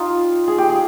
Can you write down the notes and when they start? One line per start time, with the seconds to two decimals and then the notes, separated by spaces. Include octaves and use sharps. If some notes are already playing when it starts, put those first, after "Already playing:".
Already playing: D#4 F4 G4
0.48 G#4
0.58 G4
0.70 G#4